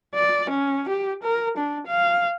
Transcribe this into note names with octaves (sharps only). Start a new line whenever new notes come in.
D5
C#4
G4
A#4
D4
F5